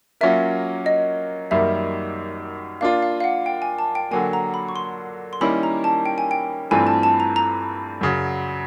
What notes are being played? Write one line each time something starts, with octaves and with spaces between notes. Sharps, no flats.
F#3 A#3 C#4 F4 A#4 E5
D#5
F#2 D#3 G3 A#3 E5
A#3 D4 F4 F5
F5
F5
F#5
G5
G#5
A5
G5
D3 F#3 A#3 G#5
A#5
B5
C#6
C6
C6
D#3 G3 A#3 C#4 E4 B5
A#5
A5
G5
G#5
G5
G2 E3 A3 C4 F4 G#5
A5
A5
A#5
A#5
F#2 C#3 F#3